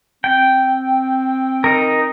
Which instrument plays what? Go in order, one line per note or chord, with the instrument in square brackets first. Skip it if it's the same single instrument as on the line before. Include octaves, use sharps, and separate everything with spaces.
[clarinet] C4 [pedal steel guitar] G5
[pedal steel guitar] D#4 A#4